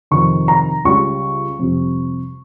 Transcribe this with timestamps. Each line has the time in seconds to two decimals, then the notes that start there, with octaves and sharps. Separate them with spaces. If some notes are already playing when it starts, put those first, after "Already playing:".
0.11 F2 C3 D#3 C#6
0.48 A#5
0.85 C#2 C#3 G3 C#6
1.59 F2 C3 G3